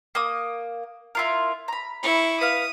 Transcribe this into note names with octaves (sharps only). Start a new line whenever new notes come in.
A#3 D#6
E4 F4 A#4
A#5 B5
E4 C#6
B4 F5 D#6